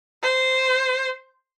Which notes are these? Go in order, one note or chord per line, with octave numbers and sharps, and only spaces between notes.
C5